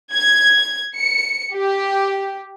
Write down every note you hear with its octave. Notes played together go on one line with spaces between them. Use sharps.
G#6
C#7
G4